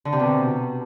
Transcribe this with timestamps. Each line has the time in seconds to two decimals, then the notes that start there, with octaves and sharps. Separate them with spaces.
0.05 D3
0.13 C3
0.20 B2